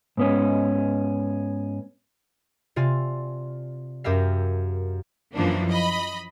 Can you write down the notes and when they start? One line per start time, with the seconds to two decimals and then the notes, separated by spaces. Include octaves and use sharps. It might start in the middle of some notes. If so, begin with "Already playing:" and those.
0.17 G#2 B3 C#4
2.76 C3 F4 D5 G#5
4.04 F#2 G4 A#4 E5 F5
5.34 F#2 E3 F3 A#3 D4
5.70 D#5 B5